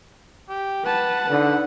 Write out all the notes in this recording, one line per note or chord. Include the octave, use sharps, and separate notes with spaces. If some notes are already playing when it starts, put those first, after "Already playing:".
G4
B4 F#5 A5
D3 D#4 B4